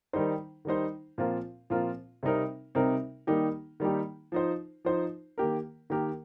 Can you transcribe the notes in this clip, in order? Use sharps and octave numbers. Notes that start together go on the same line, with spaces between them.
D#3 G3 D#4 C5
D#3 G3 D#4 C5
A#2 F3 C4 F4 A#4
A#2 F3 C4 F4 A#4
C3 G3 C4 D#4 A#4
C3 G3 C4 D#4 A#4
D#3 G3 A#3 D#4 G4
D#3 G3 A#3 D#4 G4
F3 D#4 C5
F3 D#4 C5
D#3 A#3 G4 A#4
D#3 A#3 G4 A#4